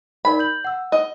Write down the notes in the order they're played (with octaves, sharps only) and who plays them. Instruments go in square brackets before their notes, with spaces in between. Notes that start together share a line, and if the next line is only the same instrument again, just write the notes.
[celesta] D#4 A#4 D5 [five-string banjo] B5
[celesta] G6 F#7
F#5 E6
[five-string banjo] D#5